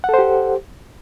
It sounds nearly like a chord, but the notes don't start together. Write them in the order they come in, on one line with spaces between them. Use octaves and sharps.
F#5 A4 C5 G4